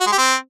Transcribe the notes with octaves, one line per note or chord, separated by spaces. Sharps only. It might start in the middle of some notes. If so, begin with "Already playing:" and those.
F#4
G#3
G4
C4